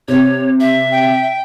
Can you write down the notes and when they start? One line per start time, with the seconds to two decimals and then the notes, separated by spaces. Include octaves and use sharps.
0.08 C3 C#5
0.60 E5
0.92 G5